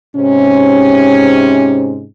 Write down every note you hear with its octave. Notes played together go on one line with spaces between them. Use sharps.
G#2 C3 C#4